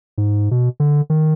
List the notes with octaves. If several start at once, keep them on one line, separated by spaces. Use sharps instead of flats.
G#2
B2
D3
D#3